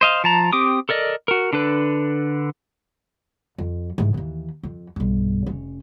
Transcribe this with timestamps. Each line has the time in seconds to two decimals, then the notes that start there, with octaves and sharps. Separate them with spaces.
0.01 C5 D#5 F5
0.24 F3 A5 A#5
0.53 C4 G4 D6 D#6
0.89 A4 A#4 D5 D#5
1.28 F#4 A#4
1.53 D3 D4 A4 B4
3.58 F2
3.98 G#2 E3
4.14 D#2 E3
4.63 F2
4.96 B1 G2
5.46 F1 C#4